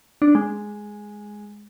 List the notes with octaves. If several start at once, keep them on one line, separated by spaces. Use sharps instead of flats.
D4
G#3